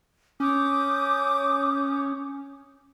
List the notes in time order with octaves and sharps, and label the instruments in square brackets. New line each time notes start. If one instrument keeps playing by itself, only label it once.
[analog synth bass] C#4 [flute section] D6 D#6 G6